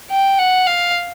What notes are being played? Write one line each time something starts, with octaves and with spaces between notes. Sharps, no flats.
G5
F#5
F5